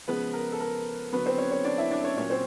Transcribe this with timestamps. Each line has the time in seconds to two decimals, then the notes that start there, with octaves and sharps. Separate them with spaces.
0.07 C#3 F3 G#3 B3 B4
0.33 A#4
0.52 A4
0.60 A#4
1.12 D3 F#3 B3 B4
1.26 C4 C5
1.38 C#4 C#5
1.51 C#4 C#5
1.64 D4 D5
1.78 E4 E5
1.91 D4 D5
2.04 C#4 C#5
2.17 A#2 F#3 C#4 C#5
2.30 C4 C5